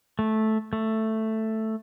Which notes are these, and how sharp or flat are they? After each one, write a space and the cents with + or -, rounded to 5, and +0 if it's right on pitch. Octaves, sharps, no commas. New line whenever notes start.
A3 -10
A3 +5